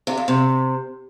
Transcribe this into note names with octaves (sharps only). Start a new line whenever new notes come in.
C3
F2
C3